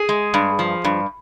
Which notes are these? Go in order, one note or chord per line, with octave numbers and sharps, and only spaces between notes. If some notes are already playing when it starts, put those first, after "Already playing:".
Already playing: G#4
G#3
G2
F3
G2